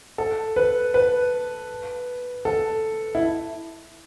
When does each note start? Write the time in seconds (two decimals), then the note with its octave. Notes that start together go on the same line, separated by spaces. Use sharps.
0.18 A4
0.56 B4
0.94 B4
2.45 A4
3.15 E4